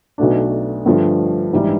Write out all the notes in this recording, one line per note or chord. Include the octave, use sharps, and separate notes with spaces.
B1 B2 F#3 A3 D4
G2 D3 F3 A3
A#1 G#2 E3 G3